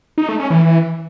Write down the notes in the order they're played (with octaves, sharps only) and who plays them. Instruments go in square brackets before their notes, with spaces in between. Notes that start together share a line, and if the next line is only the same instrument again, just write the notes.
[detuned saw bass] D#4
A3
C#4
E3